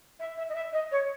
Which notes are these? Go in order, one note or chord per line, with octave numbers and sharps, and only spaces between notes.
E5
E5
D#5
E5
D#5
C#5